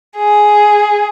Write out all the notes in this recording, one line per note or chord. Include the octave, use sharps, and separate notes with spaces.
G#4